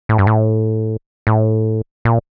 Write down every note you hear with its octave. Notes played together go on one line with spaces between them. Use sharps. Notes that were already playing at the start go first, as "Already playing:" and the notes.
A2
G2
A2
A2
A#2